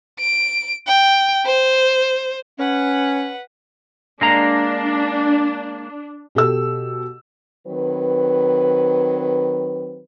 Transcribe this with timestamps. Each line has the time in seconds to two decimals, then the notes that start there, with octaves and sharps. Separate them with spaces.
0.20 D7
0.87 G5
1.46 C5
2.59 C#4 B4 F#5
4.21 G#3 A#3 D4 A#5
6.35 B2 G4 A4 E6
7.67 D#3 F#3 C4 B4